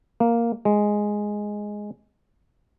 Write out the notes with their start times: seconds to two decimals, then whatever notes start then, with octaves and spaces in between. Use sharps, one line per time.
0.20 A#3
0.65 G#3